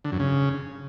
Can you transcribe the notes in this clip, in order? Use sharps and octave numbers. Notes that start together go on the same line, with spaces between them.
D3
F#2
C#3